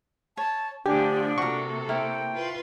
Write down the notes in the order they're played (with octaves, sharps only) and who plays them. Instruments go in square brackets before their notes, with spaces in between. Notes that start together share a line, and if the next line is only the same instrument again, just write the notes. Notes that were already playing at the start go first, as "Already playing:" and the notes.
[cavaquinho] C#5 [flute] A5
[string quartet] D3 F3 A3 [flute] D4 [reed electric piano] G4 [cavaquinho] G#5
[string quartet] C3 A#3 A4 [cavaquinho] F#4 A#4 [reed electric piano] C#6
[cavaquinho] E4 A#4 C5 [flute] G5
[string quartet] F4 B4 C6